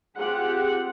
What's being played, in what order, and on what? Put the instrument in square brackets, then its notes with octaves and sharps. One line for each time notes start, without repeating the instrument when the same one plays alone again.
[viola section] C4 F4 G4 G#4 F#5